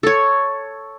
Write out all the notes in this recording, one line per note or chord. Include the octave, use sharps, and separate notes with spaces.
A4 C#5